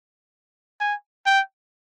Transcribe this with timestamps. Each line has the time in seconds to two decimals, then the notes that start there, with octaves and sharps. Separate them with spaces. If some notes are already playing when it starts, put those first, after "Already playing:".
0.80 G#5
1.26 G5